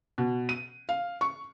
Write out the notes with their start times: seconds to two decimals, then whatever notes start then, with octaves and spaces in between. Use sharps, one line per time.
0.18 B2
0.49 D#7
0.89 F5
1.21 C#6